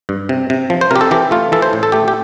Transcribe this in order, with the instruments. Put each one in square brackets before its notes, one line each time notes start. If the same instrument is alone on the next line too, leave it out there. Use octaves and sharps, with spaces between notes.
[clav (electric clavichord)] G2
C3
C3
F3
C5
C3 G4 A#4
A4
E3 G4
A3 F4
E3 A4
C5
A2
A4
A3 G4
G4